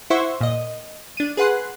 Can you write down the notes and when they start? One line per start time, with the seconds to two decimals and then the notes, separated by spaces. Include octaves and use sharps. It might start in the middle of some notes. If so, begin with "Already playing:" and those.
0.10 E4 C5 E5 F#5 C6 C#6
0.41 A#2 D#5
1.17 D4 D#7
1.37 G#4 B4 F#5 C6 F#6